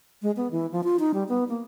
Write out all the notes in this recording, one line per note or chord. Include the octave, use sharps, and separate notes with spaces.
G#3
B3
E3
F3
F4
D#4
G3
B3
A#3